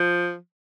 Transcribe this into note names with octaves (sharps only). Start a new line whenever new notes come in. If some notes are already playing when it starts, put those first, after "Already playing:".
Already playing: F3